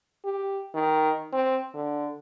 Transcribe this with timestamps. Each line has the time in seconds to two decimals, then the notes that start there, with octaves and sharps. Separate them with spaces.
0.25 G4
0.74 D#3
1.33 C4
1.74 D3